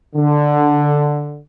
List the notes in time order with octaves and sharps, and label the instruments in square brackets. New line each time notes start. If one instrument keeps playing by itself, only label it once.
[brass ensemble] D3